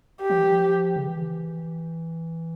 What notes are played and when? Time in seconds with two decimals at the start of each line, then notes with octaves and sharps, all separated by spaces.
0.21 G4
0.30 F3
0.38 E3
0.45 F3
0.96 C#3
1.07 E3